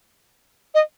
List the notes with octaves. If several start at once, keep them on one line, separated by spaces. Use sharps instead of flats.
D#5